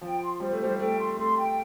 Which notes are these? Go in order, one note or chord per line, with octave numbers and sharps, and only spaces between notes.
F3 G5
C6
G3 C5
A3
G3 C5
A3 G5
C6
A3 C6
G5